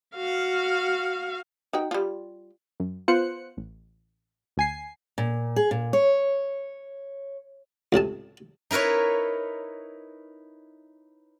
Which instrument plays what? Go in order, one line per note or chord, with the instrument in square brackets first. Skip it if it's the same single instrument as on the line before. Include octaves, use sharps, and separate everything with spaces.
[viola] F#4 F5
[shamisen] D#4 F#4 G5
G3 F4
[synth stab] F#2
B3 F4 C5 F#6 C#7
A1
D2 G#5 C7
[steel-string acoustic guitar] A#2
G#4
A#2
C#5
[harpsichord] C#2 A2 C3 A5
[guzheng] D#4 E4 A#4 B4 C#5